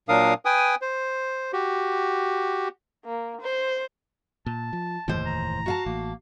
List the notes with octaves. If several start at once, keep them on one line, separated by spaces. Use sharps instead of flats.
A#2 F#3 D4 A#4 F5 D#6
B4 G5 G#5 D#6
C5
F#4 G4
A#3
C5
A#2 A5
F3
F1 D#2 A2 E3 C5
A#5
F#4 F5 A5
A1 A#3